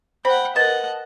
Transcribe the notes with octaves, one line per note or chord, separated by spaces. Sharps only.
C5 F#5 G5 B5
A#4 B4 D#5 F#5 A5